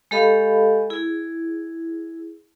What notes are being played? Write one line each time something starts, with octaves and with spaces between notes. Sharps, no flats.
G#3 G4 A4 D#5 F5 B5
E4 G#4